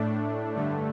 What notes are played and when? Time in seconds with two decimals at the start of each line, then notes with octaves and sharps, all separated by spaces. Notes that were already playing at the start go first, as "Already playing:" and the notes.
Already playing: A2 A3 D4
0.55 G2 D3 A3